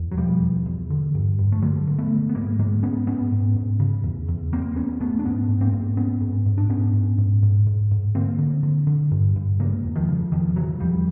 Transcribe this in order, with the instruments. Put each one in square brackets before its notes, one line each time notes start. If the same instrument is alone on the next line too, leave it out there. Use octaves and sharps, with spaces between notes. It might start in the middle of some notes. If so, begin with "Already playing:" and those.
Already playing: [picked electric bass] E2
F#3
B2 F3 G3
E2
E2
D3
G2
G2
A3
D3 F#3 G#3
D3
A3 B3
D3
B3
G#2 G#3 A#3
G#2 G#3 A#3
G#2 B3 C#4
G#2 B3 C#4
G#2
G#2
C#3
E2
E2
E2 A#3 C4
E2 B3 C#4
E2 A3 B3
D4
G#2 B3 C#4
G#2
A#3 C4
G#2
G#2 B3 C#4
G#2
G#2
D4
G#2 B3 C#4
G#2
G#2
G#2
G#2
G#2
D3 A#3 C4
D3
D3
D3
G2
G2
C#3 G#3 A#3
E2
D#3 F3
C#3
E2 D#3 F3
C#3 E3 F#3
E2 F3 G3